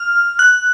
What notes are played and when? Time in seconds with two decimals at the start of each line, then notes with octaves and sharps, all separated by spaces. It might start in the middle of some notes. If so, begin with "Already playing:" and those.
Already playing: F6
0.39 F#6